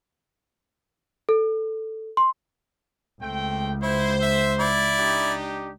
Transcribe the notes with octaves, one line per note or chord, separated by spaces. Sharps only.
A4
C6
C#2 A3 C4 G5
E4 C5
E5
E4 D5
D4 D#4 G4